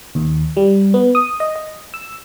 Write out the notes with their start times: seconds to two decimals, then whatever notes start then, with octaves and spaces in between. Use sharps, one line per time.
0.15 D#2
0.57 G3
0.94 B3
1.15 D#6
1.40 D#5
1.56 D#5
1.94 E6